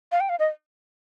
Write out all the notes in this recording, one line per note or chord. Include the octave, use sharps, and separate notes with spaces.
F5
G5
F5
D#5